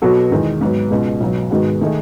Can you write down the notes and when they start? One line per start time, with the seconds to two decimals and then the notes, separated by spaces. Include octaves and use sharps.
0.02 B2 F#3 B3 F#4 A4
0.31 E2 D#3 G#3
0.61 G#2 F#3 B3
0.91 C#2 B2 G#3
1.21 B1 B2 F#3
1.51 G#2 D#3 G#3 B3 F#4
1.81 D#3 A3 D#4 G#4